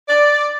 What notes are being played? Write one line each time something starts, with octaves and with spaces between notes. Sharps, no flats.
D5